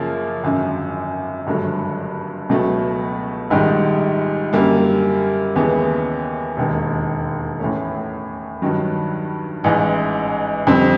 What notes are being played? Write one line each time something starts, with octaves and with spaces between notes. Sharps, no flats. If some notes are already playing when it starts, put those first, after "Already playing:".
Already playing: F#2 C#3 F3 A#3 C#4
G#1 F#2 D3
G#1 G2 D3 F#3 A3
C#2 B2 F#3 A3
A#1 G#2 D#3 G3
F#2 D3 G3 A#3
D#2 C#3 E3 G#3 B3
E1 D#2 D#3
A2 E3 A3 C#4
G2 D#3 F#3
A1 G#2 E3
F2 D3 G3 C4